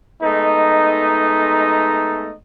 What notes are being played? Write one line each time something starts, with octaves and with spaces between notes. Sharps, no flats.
G#3 A3 B3 D#4